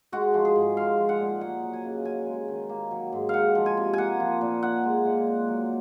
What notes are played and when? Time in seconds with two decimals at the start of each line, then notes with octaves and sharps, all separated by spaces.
0.12 G#3 F#4
0.34 F3
0.45 G#4
0.56 G#2
0.77 G#3 F5
0.98 F3
1.09 F#5
1.20 A#2
1.41 A#3 F#5
1.63 F#3
1.73 G#5
1.84 C#3
2.05 C#4 G#5
2.27 G#3
2.48 D#3
2.69 A#3
2.91 F#3
3.13 G#2
3.29 G#3 F5 F#5
3.55 F3
3.66 G#5
3.77 C3
3.93 A#3 F#5 G#5
4.20 F3
4.41 A#2
4.62 D#4 F#5
4.84 G#3
5.05 A#2
5.27 C4
5.48 F#3